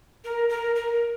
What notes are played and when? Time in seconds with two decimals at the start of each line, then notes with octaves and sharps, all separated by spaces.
0.24 A#4
0.49 A#4
0.76 A#4